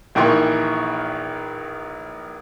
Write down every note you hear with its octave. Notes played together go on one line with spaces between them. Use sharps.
A#1 D#3 E3 A#3 G5 C#6